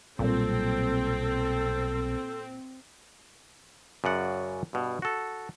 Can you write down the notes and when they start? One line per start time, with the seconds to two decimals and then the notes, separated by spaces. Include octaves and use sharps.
0.19 B1 A#2 F#3 G3 C4 A4
4.04 F#2 C#3 D5 F#5
4.73 G2 B2
5.02 F#4 A4